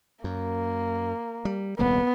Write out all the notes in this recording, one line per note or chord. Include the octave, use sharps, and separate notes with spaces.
F#2 A#3
G3
D#1 C2 A#3 B3